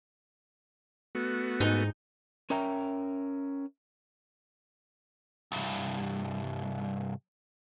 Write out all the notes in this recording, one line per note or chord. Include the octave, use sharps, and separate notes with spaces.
A3 B3 F#4
G#2 D#4 G#5
C#4 A#4 E5 G5 A#5
C2 G2